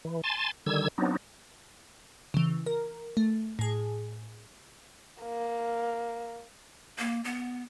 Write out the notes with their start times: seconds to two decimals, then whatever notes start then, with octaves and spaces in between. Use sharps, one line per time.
0.05 E3
0.24 G#5 A5 C6 A6
0.66 D3 D#3 G3 E6 G#6
0.98 F#3 B3 C4 D4 D#4
2.34 C#3 E3
2.66 A#4
3.17 A3
3.59 A2 G#4
5.22 A#3
6.98 A#3
7.24 B3